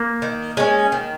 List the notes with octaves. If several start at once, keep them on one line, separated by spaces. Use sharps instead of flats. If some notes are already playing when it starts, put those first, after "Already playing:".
Already playing: A#3
D#3
G#3 C#4
D#3